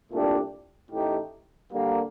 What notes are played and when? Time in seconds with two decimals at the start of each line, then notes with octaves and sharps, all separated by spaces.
0.11 C2 A#2 A3 D4 G4
0.91 A1 A2 A3 D#4 G4
1.72 D3 G3 A#3